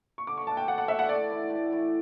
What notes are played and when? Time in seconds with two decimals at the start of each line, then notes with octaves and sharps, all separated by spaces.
0.18 C#6
0.27 D3 D6
0.37 C#6
0.47 A3 D4 A5
0.57 G5
0.68 D3 F#5
0.78 F#5
0.88 A3 D4 E5
0.99 F#5
1.09 A2 D5
1.30 E3 A3 E4
1.50 A2
1.71 E3 A3 E4